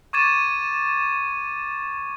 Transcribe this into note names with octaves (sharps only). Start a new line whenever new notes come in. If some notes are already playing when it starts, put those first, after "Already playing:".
C#6 D6 G#6 A6 D#7 E7